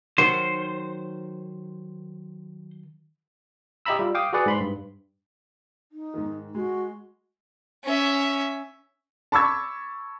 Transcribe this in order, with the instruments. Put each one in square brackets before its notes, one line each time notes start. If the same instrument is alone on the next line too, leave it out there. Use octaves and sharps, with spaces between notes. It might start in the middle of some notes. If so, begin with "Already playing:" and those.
[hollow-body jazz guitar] D#3 F#3 [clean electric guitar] C5
[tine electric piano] G4 D#5 E5 A#5 B5 E6
G3 F4
F5 G5 D6 D#6
F#4 G#4 B4 D5 F#5
G#2 B5 C6
G2
[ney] D#4
[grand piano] G#2 D#3
[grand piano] G#3 [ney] F#4
[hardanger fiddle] C#4 E5
[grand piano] A5 B5 C#6 D6 E6 G#6